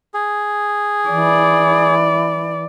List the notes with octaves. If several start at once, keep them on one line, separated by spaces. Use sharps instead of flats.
G#4
E3 D5